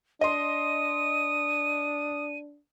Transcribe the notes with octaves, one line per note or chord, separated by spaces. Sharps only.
D4 D#5 C6 D#6 D#7